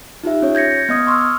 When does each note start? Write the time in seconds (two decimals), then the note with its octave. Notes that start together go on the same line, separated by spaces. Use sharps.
0.23 D#4 F4 G4 E5
0.42 C#4 C#5
0.55 G6 G#6 A#6 C#7
0.89 B3 D#5 D#6 G#6
1.07 C6 C#6 E6 F6